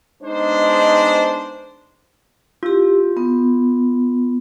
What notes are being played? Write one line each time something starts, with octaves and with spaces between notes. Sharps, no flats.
G#3 B3 D4 D#4 C5
E4 F4 G4
B3